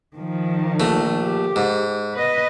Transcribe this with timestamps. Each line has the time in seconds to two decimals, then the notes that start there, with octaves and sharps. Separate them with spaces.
0.16 D#3 F3
0.80 A#1 A3
1.20 G4
1.56 G#2
2.14 B4 D#5